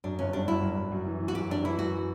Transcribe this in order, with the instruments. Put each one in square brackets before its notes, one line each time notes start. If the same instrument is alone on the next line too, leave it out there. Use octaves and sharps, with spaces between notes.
[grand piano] F#2 [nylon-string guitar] D4
[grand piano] G1 [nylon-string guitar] C#4
[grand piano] G3 [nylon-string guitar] D4
[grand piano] F#2 [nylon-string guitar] E4
[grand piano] F#2
F#2
F#2
E3
E3
[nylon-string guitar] F#4
[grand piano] F#2 [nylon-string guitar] G4
[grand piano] F#2 [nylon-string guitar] D4
[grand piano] E3 [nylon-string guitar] E4
[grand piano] F#2 [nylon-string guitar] F#4